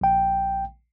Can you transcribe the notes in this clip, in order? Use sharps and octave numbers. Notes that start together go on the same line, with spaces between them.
A#1 G5